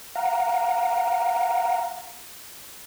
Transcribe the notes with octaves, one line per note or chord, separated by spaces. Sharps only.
F5 F#5 A#5